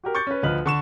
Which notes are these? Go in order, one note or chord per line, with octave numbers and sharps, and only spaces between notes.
F#4 G4 A#4
C#6 D6 G6 A6 C#7
C#4 B4
D2 F3 B4 D#5 F6 F#7
D3 C#6 E7